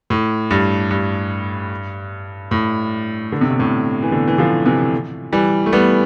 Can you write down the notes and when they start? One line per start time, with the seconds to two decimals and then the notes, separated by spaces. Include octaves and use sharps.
0.10 A2
0.51 G2
0.91 G2
2.51 A2
3.32 D3
3.41 C3
3.50 B2
3.59 A2 C3
4.03 E3
4.12 B2 D3
4.28 E3
4.38 D3 F3
4.65 C3 E3
5.33 E3 G3
5.66 A3
5.72 G3 B3